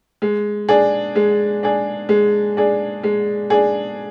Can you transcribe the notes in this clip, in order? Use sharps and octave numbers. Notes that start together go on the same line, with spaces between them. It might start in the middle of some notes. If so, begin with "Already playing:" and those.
G#3
D4 G#4
G#3
D4 G#4
G#3
D4 G#4
G#3
D4 G#4